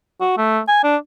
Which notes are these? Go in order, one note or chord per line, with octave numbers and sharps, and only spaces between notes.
F#4
A3
G#5
D4